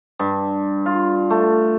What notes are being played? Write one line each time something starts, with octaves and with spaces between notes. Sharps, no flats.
G2
F4
A3